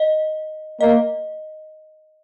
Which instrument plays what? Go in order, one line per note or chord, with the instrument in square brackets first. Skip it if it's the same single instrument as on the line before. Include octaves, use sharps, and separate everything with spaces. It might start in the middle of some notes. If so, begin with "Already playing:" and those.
Already playing: [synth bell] D#5
[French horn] A#3 [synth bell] D#5